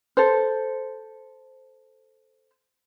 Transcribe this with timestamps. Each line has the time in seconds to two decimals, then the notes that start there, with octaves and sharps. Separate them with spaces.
0.17 A4 C5